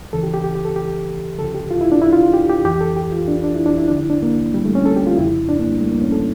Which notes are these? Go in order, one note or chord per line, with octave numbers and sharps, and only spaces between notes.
D2 C#3 E3 A4
G4
G4
G4
G4
A4
G4
D2 C#3 F3 A4
G4
F4
E4
D4
E4
F4
G4
G4
F2 E3 G4
A4
G4
F4
D4
D4
E4
D4
E4
D2 D3 F3 D4
E4
D4
A#3
G3
A3
C#4
A4
G4
F4
F2 C#3 F3 E4
D4
A#3
G3
A3
A#3
C#4
A4